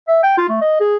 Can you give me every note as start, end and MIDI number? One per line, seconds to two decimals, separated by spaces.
0.08 0.20 76
0.23 0.36 79
0.38 0.49 65
0.49 0.57 57
0.61 0.80 75
0.80 0.97 68